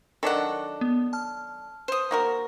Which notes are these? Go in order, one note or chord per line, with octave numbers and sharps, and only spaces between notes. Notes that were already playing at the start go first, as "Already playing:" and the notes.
D#3 F#3 D4 A4 F#5 C#6
B3
A5 F6
C5 D#6
A#3 F#4 A#4